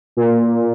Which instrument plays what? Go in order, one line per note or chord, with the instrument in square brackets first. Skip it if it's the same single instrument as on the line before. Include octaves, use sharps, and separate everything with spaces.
[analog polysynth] A#2